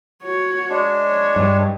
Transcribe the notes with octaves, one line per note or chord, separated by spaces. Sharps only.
F#4 C#5
G#3 D4
C#5
G2